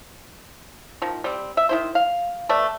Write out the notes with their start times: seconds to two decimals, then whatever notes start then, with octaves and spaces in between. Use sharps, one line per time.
1.02 D#3 F3
1.24 G3 C4
1.57 E5
1.69 D#3 E4 C5
1.95 F5
2.49 A3 B4 D5